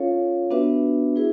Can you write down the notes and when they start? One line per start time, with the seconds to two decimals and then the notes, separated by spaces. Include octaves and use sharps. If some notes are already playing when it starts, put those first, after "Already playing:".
Already playing: C#4 F4 A4 C#5 F5
0.50 B3 D4 F#4 B4 E5
1.16 E4 G#4 B4